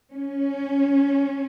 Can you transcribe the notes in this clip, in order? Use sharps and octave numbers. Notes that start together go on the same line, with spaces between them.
C#4